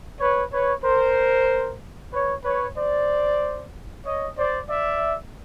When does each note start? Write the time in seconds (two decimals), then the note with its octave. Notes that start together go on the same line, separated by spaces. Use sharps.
0.20 B4 C#5
0.52 B4 C#5
0.84 A#4 C5
2.12 B4 C#5
2.44 B4 C#5
2.76 C5 D5
4.05 C#5 D#5
4.37 C5 D5
4.69 D5 E5